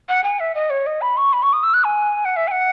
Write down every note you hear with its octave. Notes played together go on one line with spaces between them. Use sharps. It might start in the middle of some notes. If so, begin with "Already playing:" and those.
F#5
G#5
E5
D#5
C#5
D#5
B5
C#6
B5
C#6
D#6
E6
F#6
G#5
F#5
E5
G#5
F#5